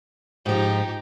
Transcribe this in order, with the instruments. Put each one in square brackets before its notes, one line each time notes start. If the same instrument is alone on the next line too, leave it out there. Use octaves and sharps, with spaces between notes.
[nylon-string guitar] G#2 F3 [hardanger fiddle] D#4 G4